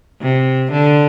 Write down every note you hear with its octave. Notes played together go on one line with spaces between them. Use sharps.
C3
D3